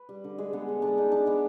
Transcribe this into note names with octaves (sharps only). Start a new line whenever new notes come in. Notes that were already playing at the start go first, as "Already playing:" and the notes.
Already playing: B4
G3
D3
G#3 G#4
D3 B3
G#3
D3 D4
D3 D#4
D3 D4
G#3 B3